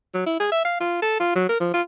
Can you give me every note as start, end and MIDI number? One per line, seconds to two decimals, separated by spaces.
0.14 0.22 54
0.26 0.36 64
0.40 0.51 68
0.52 0.65 76
0.65 0.76 77
0.80 0.99 65
1.02 1.17 69
1.20 1.32 65
1.35 1.47 54
1.49 1.58 70
1.60 1.69 53
1.73 1.82 65